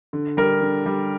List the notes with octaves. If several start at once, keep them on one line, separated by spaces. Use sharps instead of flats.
D3
G3 A#4
D3
G3